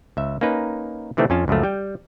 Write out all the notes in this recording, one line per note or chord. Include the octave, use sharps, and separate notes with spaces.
C#2 E5
A#3 C#4 D#4 B4
C3 D#3 E3 A3 C4 D4
F2 C#4 F4 A5
C#2 F#2 F3 A3
G3 G5